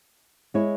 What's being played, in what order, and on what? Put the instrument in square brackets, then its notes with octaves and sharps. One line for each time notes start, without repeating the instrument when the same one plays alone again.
[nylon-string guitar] G#3 E4 C#5